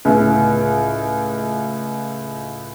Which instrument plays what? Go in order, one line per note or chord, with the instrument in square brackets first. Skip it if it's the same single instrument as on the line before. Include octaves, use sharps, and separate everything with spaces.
[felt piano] C#2 A2